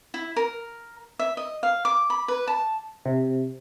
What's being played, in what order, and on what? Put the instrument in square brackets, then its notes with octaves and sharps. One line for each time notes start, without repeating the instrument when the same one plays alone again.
[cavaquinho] E4
A#4
E5
D#5
F5
D6
B5
B4
A5
[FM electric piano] C3